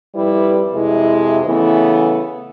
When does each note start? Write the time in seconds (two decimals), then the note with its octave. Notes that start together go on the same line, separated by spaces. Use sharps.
0.15 F2 G3 E4 B4
0.74 F2 C3 G#3 E4
1.46 C#3 E3 A3 B3 E4